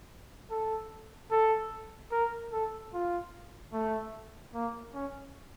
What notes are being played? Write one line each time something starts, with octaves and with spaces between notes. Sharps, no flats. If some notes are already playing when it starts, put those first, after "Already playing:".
A4
A4
A#4
A4
F4
A3
A#3
C#4